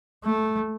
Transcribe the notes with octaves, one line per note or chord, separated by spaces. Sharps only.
A3